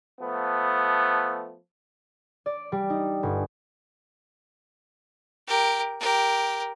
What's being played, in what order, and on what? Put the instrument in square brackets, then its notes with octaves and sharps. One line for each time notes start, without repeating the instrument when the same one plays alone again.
[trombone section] F3 A3 B3
[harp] D5
G3
D#4
G1
[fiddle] G4 A#4
G4 A#4